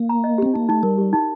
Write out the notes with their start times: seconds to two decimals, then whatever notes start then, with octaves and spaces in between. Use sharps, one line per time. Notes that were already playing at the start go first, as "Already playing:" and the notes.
Already playing: A#3
0.09 A#5
0.24 D#5
0.38 C4 G4
0.54 A#3 D#4
0.69 A3 D#4
0.83 G3 A#4
0.98 G4
1.13 D#4